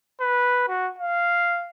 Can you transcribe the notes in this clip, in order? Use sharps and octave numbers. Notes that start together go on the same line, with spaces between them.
B4
F#4
F5